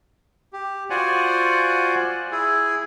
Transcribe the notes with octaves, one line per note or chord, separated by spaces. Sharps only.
G4
F4 F#4 C5 D5 F#5 G#5
E4 G#4